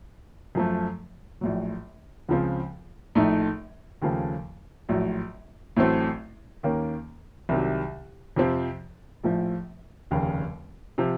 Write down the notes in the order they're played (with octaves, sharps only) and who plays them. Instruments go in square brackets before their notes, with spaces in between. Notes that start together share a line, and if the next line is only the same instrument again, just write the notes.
[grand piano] F#2 F3 A3
A#1 A2 F#3
C#2 C#3 F3 C4
A#1 A2 A3 D#4
D#2 C#3 F3 A3
A#1 A2 F#3
A1 A2 F#3 A3 C4
D#2 D#3 A#3 C#4
C2 C3 D#3 F#3
F2 C3 F3 C4
A#1 A2 F3
F1 D#2 C#3
C3 F3